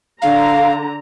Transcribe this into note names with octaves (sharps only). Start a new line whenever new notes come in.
D3 F5 A#5